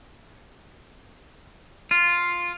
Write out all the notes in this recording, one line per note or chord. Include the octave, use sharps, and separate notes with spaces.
F4